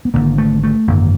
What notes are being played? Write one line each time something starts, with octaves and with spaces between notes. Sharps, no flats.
B3
G#1 F#2 D3 A#3
A3
A3
G#1 F#2 D3 A#3